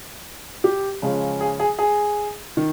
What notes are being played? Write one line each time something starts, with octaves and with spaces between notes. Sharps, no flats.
G4
C#3 F3 G#3 C#4
G#4
G#4
G#4
D#3